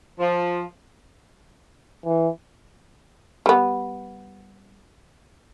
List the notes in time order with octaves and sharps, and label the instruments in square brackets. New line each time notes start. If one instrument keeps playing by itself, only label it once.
[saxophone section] F3
[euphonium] E3
[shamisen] G3 B3